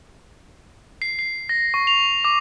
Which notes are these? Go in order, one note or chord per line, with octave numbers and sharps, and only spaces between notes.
C7
C7
A#6
C#6
F7
D6